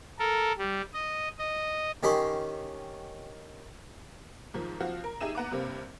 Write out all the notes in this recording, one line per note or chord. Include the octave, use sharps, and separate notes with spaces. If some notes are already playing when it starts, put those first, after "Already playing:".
A4 A#4
G3
D#5
D#5
D#3 C#4 G4 D#5 B5 C6
G#2 D#3 F3
F3 C4 F#4 F5
A#4
D#4 G4 G#4 E5 D#7 E7
B3 F#5 A#5 D6
G2 C3 A#3 C4